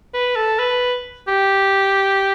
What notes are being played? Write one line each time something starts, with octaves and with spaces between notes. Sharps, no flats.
B4
A4
B4
G4